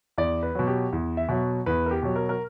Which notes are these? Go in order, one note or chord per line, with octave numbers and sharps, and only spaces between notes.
E2 D5
B4
B2 F#3
G4
E2
E5
B2 F#3
E2 B4
A#4
G4
B2 F#3
A#4
A#4